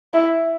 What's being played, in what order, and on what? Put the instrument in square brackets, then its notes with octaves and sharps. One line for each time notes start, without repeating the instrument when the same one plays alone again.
[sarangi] E4